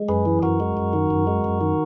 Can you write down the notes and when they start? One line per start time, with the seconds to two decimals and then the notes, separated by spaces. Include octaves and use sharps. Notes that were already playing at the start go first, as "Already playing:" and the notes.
Already playing: G#3
0.09 F#2 G#4 B4
0.25 E3
0.42 F#2 F#4 A#4
0.60 G#3
0.77 F#2
0.93 D#3
1.10 F#2
1.27 G#3
1.44 F#2
1.61 D#3